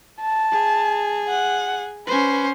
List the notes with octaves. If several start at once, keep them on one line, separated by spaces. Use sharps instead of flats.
A5
G#4
F#5
C#4 B4 C5